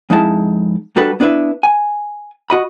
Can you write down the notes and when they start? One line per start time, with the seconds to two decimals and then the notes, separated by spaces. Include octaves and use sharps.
0.10 F2 G#3 D#4 E4 A5
0.96 G3 D4 F#4 A4 B4
1.20 B3 D4 E4 B4 E5
1.63 G#5
2.50 F#4 D#5 B5